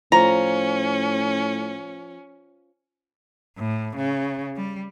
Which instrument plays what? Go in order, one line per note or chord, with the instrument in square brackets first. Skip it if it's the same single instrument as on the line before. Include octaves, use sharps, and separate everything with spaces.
[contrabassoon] A2 [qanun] F3 [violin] C#4 [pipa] A#5
[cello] A2
C#3
G3